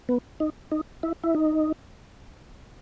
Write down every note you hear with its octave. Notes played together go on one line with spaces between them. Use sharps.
B3
D#4
D#4
E4
E4
D#4